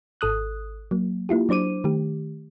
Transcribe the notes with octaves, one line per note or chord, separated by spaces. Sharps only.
G#1 A4 D#6 F#6
F#3 A#3
A#3 E4 F4 G4
F#3 D4 C5 D6 D#7
D#3 A3 G4